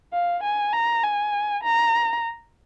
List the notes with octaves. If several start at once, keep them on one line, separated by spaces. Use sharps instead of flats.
F5
G#5
A#5
G#5
A#5